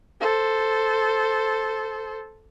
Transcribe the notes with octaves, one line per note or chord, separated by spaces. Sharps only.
A4 C5